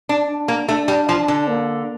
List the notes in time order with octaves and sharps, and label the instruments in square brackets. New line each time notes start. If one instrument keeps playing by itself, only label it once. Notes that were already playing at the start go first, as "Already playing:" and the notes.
[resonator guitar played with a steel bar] D4
[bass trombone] D4
[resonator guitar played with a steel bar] A#3
[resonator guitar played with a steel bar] A3 [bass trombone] D4
[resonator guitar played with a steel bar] G3
F3
D3
[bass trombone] A#3